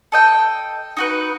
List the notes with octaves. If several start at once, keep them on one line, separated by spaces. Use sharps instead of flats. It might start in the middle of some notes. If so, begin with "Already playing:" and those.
A4 D#5 G5
D#4 F#4 B4